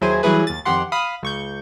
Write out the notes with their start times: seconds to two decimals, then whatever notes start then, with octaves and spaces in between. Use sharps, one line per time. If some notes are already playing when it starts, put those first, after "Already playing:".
0.01 D#2 F#3 E4 G#4 C5 G#5
0.23 E3 F#3 G3 E4 G#4 B4
0.47 D#2 A6
0.65 F2 D#3 G4 F#5 C6
0.92 F5 B5 D#6
1.23 C#2 C#6 G6